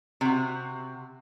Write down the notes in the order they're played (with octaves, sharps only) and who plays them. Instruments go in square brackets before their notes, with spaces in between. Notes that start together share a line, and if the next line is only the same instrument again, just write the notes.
[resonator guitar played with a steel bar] C3 F#4